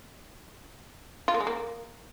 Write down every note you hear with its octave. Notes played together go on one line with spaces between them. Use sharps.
F4
A#3
G#3
A#3